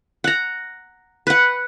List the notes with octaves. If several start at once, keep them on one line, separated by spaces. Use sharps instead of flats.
F#5 A#5
B4 F#5